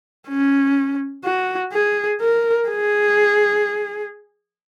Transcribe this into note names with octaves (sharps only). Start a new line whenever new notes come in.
C#4
F#4
G#4
A#4
G#4